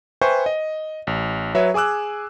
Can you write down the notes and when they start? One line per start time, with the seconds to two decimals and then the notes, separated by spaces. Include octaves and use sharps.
0.21 B4 C5 E5 G5 G#5 C#6
0.46 D#5
1.07 A1
1.55 F#3 B4 C#5 E5
1.74 G#4 G#5 D6 E6 F#6